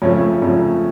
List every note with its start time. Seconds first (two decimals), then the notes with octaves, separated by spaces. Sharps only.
0.02 F2 C#3 F3 A3 C#5
0.42 F2 C#3 F3 A3